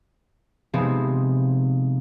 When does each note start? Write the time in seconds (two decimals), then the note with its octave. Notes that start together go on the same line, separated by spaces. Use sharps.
0.73 C3 F3 G#3 B3 C4 D#4